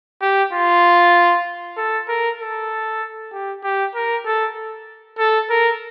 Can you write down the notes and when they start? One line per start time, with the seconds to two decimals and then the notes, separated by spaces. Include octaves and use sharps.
0.21 G4
0.53 F4
1.77 A4
2.08 A#4
2.39 A4
3.32 G4
3.63 G4
3.95 A#4
4.25 A4
5.18 A4
5.50 A#4